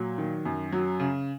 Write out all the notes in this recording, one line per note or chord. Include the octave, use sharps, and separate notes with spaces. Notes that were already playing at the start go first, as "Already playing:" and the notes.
Already playing: A#2 F#3
D#3
F#2
F#3
C#3